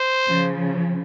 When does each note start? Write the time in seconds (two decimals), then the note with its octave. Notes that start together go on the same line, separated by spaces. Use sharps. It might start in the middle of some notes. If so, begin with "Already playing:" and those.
Already playing: C5
0.28 C#3 F3